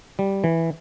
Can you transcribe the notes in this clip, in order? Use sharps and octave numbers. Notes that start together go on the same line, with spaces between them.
G3
E3